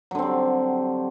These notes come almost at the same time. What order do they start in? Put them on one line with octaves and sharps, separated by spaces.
F#3 D3 C4 G3